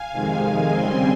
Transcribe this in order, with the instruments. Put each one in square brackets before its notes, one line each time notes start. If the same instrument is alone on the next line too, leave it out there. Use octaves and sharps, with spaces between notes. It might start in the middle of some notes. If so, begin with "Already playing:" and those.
Already playing: [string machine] F5 G#5
F2 C3 D#3 G#3
C#3 G3 C4 G#5 C6